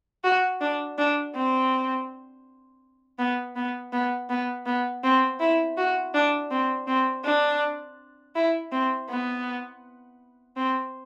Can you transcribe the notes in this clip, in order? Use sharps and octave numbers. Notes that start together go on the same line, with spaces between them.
F#4
D4
D4
C4
B3
B3
B3
B3
B3
C4
E4
F#4
D4
C4
C4
D4
E4
C4
B3
C4